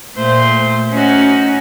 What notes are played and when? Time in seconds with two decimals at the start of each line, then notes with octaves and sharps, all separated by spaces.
0.15 A#2 A3 C5
0.91 C#4 D#4 F#4